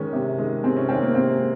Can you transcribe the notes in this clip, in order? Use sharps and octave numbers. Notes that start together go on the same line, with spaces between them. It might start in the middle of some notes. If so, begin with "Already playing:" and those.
Already playing: D#3 G#3 C#4
C3
D#3 G#3
C3 C4
C#4
D#3 G#3 C4
A#3
C3 C4
G#3